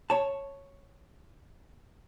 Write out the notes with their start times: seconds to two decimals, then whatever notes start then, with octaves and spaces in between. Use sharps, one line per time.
0.10 C#5 A5